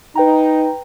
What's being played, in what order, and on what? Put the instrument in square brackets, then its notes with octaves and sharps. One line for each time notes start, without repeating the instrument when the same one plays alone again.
[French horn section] D#4 [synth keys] B4 G5 A#5